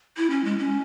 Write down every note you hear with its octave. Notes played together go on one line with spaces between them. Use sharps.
E4
C#4
G#3
C#4